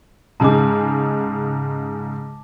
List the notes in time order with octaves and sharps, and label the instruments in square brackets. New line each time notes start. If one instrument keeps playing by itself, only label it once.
[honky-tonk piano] G#2 C#3 G#3 [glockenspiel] A5 D6